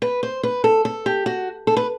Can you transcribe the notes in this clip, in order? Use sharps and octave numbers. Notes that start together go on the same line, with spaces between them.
B4
C5
B4
A4
A4
G4
F#4
A4
B4